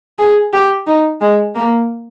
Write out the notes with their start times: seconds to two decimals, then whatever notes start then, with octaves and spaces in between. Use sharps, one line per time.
0.19 G#4
0.53 G4
0.87 D#4
1.21 G#3
1.55 A#3